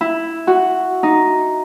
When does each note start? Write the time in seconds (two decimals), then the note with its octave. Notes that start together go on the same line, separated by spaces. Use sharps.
0.01 E4
0.47 F#4
1.03 D#4